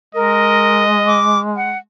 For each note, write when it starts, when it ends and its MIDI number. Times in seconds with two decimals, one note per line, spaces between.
0.15 1.80 56
0.15 0.84 70
0.15 1.28 75
1.07 1.39 86
1.56 1.78 78